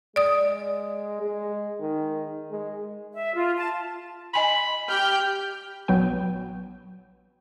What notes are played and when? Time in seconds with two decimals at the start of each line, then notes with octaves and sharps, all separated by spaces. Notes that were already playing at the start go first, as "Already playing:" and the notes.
0.16 G#3 D5 D#6
1.22 G#3
1.81 D#3
2.51 G#3
3.13 E5
3.34 F4
3.56 A5
4.34 D#5 G#5 B5 C6
4.89 G4 G5 F6 G6
5.88 A#1 F#3 B3 G5